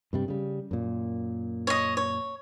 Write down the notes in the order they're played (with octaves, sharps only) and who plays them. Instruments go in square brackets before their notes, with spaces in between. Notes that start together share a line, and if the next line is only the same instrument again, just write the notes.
[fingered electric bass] G2 C3 G3
C#3 G3
F#2 A#2
[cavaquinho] C#5 D#5
C#5